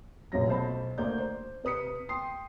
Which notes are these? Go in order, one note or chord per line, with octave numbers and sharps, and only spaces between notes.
F1 A#1 F#2 F#3 A#6
B1 C5 A5 B5
D2 A#3 C5 D5 G6
C5
C3 B4 D#6 B6 C#7
G5 C6 D#6 C7